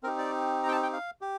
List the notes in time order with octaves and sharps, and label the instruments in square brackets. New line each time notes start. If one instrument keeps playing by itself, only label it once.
[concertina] C4 A#4
D#4 G4
D5
A#5
G5
A5
G5
F5
G4